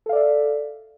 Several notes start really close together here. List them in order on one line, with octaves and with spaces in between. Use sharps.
A4 F5 D5 E5